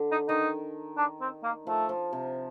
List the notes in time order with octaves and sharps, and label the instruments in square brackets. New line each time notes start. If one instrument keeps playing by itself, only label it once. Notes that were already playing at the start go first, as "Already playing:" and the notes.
Already playing: [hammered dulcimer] D3
[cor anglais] D#4
[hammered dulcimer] D#3 [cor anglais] D#4
[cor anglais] D4
C4
A#3
[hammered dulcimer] F3 [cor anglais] A3
[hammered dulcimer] F3
C3